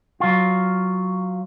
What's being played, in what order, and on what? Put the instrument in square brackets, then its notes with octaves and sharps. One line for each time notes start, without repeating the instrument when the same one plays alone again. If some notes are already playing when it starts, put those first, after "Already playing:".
[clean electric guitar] F#3 F4